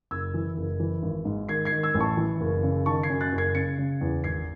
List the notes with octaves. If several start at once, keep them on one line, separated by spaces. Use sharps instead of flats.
F#1 E6 G#6
E3
F#1
E3
G#1
G#2
D#3 G#6 C7
G#6 C7
D#3
E6 G#6
A1
A5 C#6
E3
F#1
C#3
D#3 A5 C#6
G#6 C7
F#2
F#6 A6
F#1
G#6 C7
C#3 A6 C#7
C#3
E2
G#1 G#6 C7